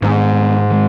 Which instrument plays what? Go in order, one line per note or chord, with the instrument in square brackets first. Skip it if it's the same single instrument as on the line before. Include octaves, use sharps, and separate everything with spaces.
[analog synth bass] G#2 [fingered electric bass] D#3 G#3 B3
[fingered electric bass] D#3 G#3